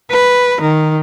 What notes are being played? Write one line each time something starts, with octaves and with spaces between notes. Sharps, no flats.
B4
D#3